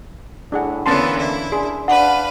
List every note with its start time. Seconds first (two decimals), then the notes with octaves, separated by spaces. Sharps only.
0.52 A2 D4 G#4 F#5
0.86 D3 E3 A#3 B3 C#4 A5 C6
1.20 E4
1.52 D4 G#4 C6
1.88 D4 B4 F5 F#5